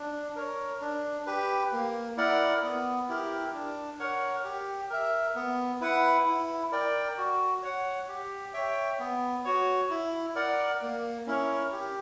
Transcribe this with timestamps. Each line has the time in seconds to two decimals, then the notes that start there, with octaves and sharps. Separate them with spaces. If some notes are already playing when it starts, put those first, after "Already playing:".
Already playing: D4
0.36 A#4 C#5
0.81 D4
1.26 G4 B4
1.72 A#3
2.17 E4 A#4 D5 F#5
2.63 B3
3.08 E4 G4 A#4
3.54 D4
3.99 A#4 C#5 F#5
4.44 G4
4.90 A#4 E5
5.36 B3
5.81 E4 B4 F#5
6.27 E4
6.72 A#4 D5 G5
7.17 F#4
7.62 C#5 F#5
8.08 G4
8.53 C#5 E5 G5
8.99 B3
9.45 F#4 C#5
9.90 E4
10.35 A#4 D5 F#5
10.82 A#3
11.27 C#4 E4 A#4 C#5
11.72 G4